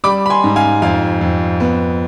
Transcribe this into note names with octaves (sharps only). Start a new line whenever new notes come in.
G3 B5 D6
B5
G#5 C6
G#2
F5 G#5
F2 F5 G#5
F2
B3